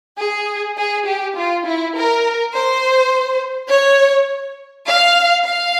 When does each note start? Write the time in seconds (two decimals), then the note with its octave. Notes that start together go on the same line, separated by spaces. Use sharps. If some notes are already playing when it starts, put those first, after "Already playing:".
0.18 G#4
0.77 G#4
1.06 G4
1.36 F4
1.66 E4
1.95 A#4
2.53 C5
3.70 C#5
4.87 F5
5.45 F5